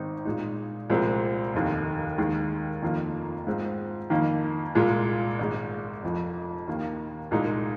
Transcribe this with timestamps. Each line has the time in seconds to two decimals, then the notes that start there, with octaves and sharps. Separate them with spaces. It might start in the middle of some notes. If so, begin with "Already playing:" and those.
Already playing: G#1 G#2 D#3 C4 D#4
0.25 A#2 G#3 D#4
0.90 C2 A#2 F3 G#3 C4
1.53 F1 D#2 D#3
2.18 D#2 D#3 G#3
2.82 F1 F2 D#3 A#3 F4
3.47 G#2 G#3 C4 F4
4.10 F2 D#3 A#3 D#4
4.75 C2 A#2 G#3 F4
5.39 G#1 G#2 G#3
6.03 F1 F2 F3
6.68 D#2 D#3 A#3
7.31 C2 A#2 G#3 D#4